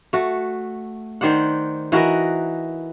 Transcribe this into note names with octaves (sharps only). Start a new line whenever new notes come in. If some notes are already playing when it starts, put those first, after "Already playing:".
A3 F#4
D#3 C5 D5 F#5
E3 F#4 A#4 D#5